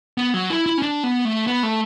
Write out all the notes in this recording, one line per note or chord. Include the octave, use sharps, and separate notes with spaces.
B3
F#3
E4
E4
C#4
D4
B3
A3
B3
A3